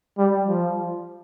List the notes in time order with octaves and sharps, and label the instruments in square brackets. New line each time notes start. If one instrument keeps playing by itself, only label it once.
[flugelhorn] G3
F3